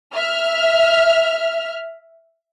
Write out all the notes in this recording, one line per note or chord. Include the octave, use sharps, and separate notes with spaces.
E5 F6